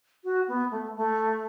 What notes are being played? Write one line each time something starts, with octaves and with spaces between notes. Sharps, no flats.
F#4
B3
A3
A3